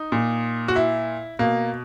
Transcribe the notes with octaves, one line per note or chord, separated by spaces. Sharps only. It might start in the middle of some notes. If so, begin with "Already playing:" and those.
Already playing: D#4
A#2
F#4
E4
B2 A#3